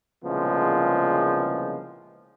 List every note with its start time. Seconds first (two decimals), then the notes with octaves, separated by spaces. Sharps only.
0.25 C2 A#2 C#3 F3 G#3 B3